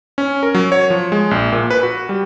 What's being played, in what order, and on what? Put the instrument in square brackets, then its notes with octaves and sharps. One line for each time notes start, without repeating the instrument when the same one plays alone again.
[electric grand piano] C#4
A#4
F#3
C#5
F3
G#3
A#1
A#2
B4
F#4
G3